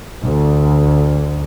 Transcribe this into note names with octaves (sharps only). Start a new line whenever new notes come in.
D2